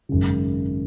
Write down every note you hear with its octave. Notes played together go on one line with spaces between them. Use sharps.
G#1 F#2 C#3